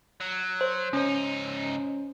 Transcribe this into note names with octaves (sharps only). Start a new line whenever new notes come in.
F#3
C5
C#2 C#4 D#4 C5